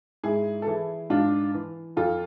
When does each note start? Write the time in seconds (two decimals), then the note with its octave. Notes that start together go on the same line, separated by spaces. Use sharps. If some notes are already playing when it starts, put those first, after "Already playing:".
0.23 G#2 E4 G#4
0.62 A4
0.67 E3 E4 G#4
1.10 G#2 D4 F4
1.54 E3
1.97 F2 F4 A4